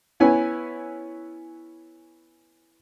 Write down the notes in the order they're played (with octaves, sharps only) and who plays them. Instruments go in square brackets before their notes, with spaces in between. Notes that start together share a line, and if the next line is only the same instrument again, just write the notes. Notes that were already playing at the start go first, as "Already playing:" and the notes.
[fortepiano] B3 C#4 E4 G#5